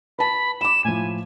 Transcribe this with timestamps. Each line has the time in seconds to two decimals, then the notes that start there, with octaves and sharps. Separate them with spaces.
0.19 B4 A5 B5
0.61 B5 D6 E7
0.85 A2 F3 G#5